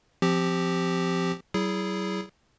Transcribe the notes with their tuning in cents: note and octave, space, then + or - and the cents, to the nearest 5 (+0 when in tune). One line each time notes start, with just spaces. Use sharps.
F3 -5 C4 +0 G4 +0
F#3 +45 E4 +0 G#4 +0